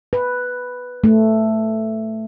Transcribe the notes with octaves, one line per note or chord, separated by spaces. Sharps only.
B4
A3